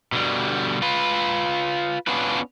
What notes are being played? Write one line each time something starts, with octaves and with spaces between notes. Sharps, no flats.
B2 D3 G3
F4 B4
B3 C#4 D4 F4 B4